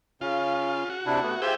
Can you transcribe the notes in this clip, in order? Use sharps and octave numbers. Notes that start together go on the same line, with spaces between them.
C#3 C#4 F4
F#4
C3 D4 E4
A3 B3
F4 G4 G#4 C5 E5 G5